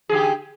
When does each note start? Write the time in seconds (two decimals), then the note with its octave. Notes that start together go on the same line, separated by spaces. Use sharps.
0.09 G#4
0.12 D3
0.15 G4